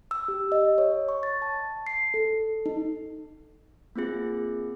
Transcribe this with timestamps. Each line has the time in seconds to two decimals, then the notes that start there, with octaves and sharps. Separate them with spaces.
0.11 E6
0.28 G4
0.52 D#5
0.78 C#5
1.08 C#6
1.23 A6
1.42 A5
1.87 C7
2.14 A4
2.66 D#4
3.96 A#3 C4 F4 G#4